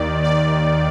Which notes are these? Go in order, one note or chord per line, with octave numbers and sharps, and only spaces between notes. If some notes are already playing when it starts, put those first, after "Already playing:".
Already playing: D#2 D#3 D5
D5